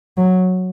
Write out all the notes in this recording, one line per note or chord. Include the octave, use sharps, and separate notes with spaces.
F#3